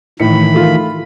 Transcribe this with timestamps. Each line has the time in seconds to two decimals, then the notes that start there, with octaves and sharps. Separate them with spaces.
0.20 A2 D#3 E3 B5 C#7
0.54 A3 F4 A#4